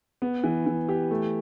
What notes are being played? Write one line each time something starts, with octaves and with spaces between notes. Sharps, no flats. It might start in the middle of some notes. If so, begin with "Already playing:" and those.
B3
E3
E3
G4
A3